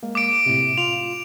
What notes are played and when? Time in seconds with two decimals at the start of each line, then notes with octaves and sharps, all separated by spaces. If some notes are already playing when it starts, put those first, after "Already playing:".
0.03 G#3 A#3
0.15 D6 D7
0.46 A2 C3
0.77 F4 F7